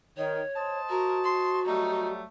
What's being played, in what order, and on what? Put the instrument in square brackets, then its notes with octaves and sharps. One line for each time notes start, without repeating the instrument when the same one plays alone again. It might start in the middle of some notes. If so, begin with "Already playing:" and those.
[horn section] D#3 [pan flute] C#5
[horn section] C5 D#5 A5
[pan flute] F#4 [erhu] A#4
[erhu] C6
[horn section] F#3 G3 A3 [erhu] D#4